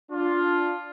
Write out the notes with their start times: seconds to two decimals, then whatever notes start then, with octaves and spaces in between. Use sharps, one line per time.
0.11 D4 F4